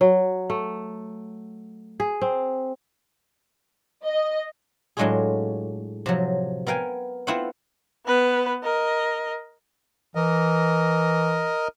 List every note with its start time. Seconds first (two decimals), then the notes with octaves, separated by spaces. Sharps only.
0.01 F#3
0.50 A3
2.00 G#4
2.21 C4
4.03 D#5
4.97 A2 F#3 G#3 D4 F4 G#4
6.06 C3 F3 F#3
6.67 B3 A#4 F5 G5 G#5
7.27 B3 C4 E4 F4 C5 F#5
8.06 B3 B4
8.64 A#4 D#5
10.15 E3 A#4 D#5